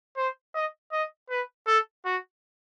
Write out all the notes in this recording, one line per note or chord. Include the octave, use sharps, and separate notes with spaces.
C5
D#5
D#5
B4
A4
F#4